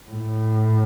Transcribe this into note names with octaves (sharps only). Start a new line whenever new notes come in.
A2